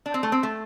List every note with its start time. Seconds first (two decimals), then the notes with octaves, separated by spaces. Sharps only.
0.06 D4
0.14 C4
0.23 A3
0.32 C4
0.43 A3